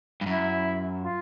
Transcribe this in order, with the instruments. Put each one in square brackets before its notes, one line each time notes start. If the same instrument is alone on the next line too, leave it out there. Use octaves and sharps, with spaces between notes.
[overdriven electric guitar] G2
[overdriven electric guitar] F#2 [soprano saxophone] E4
[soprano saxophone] F4